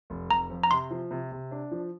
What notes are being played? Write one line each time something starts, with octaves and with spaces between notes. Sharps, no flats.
F1
F1 A#5
F2
A#5
C3 C6
F3
C3
C3
D4
F3